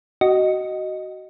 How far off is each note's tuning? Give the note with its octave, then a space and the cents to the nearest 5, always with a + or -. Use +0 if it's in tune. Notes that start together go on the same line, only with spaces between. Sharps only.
F#4 +20 D#5 +0